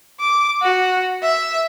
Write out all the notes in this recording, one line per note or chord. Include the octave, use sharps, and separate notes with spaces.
D6
F#4
E5